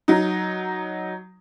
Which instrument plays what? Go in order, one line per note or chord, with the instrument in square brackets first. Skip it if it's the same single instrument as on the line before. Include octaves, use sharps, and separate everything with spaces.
[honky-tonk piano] F#3 D#4